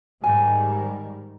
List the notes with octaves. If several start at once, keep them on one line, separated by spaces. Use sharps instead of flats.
G#2 D#3 G3 G#5